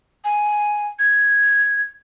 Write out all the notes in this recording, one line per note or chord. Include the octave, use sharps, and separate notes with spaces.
G#5
G#6